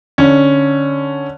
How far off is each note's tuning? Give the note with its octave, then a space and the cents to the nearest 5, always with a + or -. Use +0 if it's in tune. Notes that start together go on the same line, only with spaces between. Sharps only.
D3 +0 C#4 +0